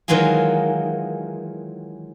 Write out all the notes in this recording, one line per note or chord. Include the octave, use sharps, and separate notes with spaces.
D#3 E3 F#3 G#3 F4 G#4